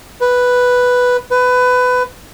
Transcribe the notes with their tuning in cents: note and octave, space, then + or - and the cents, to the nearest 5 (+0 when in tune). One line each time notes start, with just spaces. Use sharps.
B4 +0
B4 +20